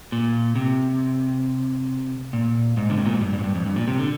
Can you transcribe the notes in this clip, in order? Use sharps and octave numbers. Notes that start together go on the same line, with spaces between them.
A#2
C3
A#2
G#2
D3
C3
A#2
G#2
G2
G2
G#2
G2
F2
G2
A#2
C3
D3